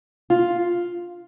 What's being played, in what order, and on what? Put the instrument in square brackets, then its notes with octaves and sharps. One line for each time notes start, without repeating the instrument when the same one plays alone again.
[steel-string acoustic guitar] F4